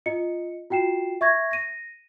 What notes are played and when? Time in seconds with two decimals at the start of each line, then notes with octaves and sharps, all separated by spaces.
0.06 F4 D#5 C#7
0.70 F4 F#4 G5 C7 E7
1.21 E5 C#6 G#6 A#6
1.51 A#6 D#7